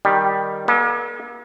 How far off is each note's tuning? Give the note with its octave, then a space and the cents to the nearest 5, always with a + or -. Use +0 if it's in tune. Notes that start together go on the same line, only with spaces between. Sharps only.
D#3 -5 G3 +0
A#3 +45 A4 -30